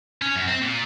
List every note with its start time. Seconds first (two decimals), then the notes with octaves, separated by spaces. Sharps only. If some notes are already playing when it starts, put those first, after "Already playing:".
0.22 C#4
0.35 F#2
0.47 C4
0.62 A#2